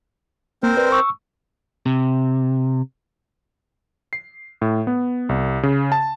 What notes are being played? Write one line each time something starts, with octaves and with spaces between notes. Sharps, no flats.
A#3 C4 A#4 C5
B4 D5
C#6 E6
C3
C7
A2
B3
C2
C#3
A5